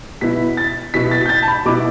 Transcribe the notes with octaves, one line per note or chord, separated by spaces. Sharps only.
B2 B3 E4 B6
A6
B2 B3 E4 B6
A6
G6
A6
A5
B5
B2 B3 E4 D6